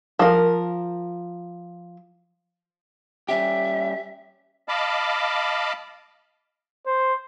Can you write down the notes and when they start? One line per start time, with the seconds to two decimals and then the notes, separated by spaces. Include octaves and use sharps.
0.19 F3 A#4
3.29 G3 C#4 G4 E5
4.68 D#5 F5 A5 B5 D6
6.86 C5